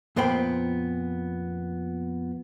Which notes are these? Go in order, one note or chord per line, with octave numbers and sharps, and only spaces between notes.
F2 A#2 B3 C5 G5 B5